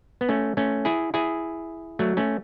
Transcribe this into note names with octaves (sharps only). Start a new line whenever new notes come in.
B3
A3 C#4
A3 C#4
E4 G#4
E4 G#4
F#3 A3
A3 C#4